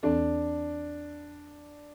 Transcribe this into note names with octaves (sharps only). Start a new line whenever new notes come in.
E2 E3 C4 D4 A4